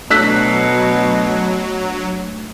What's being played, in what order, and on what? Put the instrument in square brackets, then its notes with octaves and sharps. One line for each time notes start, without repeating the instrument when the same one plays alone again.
[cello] B2 [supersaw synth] F#3 [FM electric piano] A3 D4 [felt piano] E6 F#6 B6